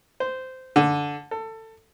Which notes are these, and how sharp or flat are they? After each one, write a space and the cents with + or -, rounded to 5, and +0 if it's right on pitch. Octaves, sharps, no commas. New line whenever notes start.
C5 -15
D3 -10
A4 +20